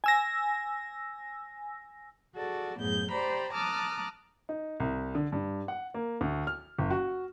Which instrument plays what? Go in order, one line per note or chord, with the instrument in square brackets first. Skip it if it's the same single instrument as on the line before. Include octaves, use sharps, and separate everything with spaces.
[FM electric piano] G#5 E6 A#6
[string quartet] F#4 G#4 A4 D5
F#2 A2 B3 G#4 G6
G4 C5 D5 A#5 B5
A5 A#5 D6 D#6 F6 F#6
[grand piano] D#4
C2
D3
G2
F#5
A#3
D2
F6
F#1
F#4